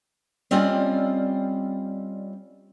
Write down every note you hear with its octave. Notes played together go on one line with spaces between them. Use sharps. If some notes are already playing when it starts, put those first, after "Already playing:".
G3 C4 C#4 F4 D5 D#5